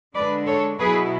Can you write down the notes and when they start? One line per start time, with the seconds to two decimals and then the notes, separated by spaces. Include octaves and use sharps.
0.14 D3 G#3 D4 B4 D5
0.46 A4 C#5
0.79 B2 F#3 B3 E4 G#4 B4